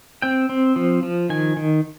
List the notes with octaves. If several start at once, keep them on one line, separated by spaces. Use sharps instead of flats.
C4 G5
C4
F3
F3
D#3 G#5
D#3